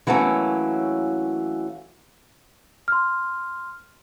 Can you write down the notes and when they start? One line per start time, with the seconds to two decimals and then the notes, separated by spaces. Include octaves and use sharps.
0.07 E3 F#3 A3 A#3 C#4
2.88 C6 F6